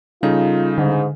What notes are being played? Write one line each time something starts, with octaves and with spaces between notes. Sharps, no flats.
C#3 G3 D#4 F4 A4 F5
G#2 D3